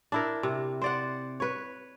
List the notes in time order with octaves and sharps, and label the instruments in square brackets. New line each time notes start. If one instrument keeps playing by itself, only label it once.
[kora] D4 E4 A#4
C3
C5 D5 F#5
B4 C#5